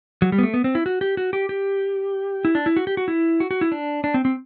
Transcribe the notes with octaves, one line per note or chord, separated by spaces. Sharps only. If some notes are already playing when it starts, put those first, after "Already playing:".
F#3
G3
B3
A3
B3
C4
E4
F#4
G4
F#4
G4
G4
E4
D4
E4
F#4
G4
F#4
E4
F#4
F#4
E4
D4
D4
C4
C4